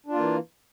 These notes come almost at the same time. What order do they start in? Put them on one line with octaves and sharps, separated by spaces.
D4 F4 A#3 E3